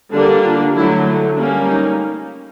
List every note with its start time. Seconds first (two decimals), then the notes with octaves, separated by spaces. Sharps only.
0.13 D3 G3 A#3 D4
0.43 F4
0.75 D3 F#3 A3 E4
1.37 G3 A#3 C#4 D4
1.67 D#4